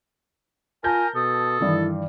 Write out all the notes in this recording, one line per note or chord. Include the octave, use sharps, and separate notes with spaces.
F4 A#4 G#5 A5 G6 A#6
B2 A4 D#6
G2 D#3 E3 E4